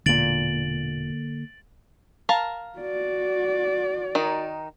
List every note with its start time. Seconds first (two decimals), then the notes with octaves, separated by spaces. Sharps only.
0.06 E1 A#2 D3 A#3 A6 D7 F#7
2.29 A#4 F5 A5
2.78 F#4 D5
4.15 D#3 D#4